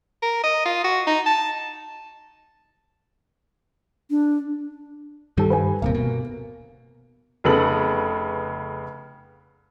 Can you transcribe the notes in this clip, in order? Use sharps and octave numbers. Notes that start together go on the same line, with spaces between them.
A#4
D#5
F4
F#4
D#4
A5
D4
G2 D#3 G3 G4 A4
B4 G#5
D1 G1 C3 A#3
B2
F1 C#3 B3 A4 F#7